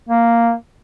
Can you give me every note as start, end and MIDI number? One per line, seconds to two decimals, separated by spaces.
0.09 0.53 58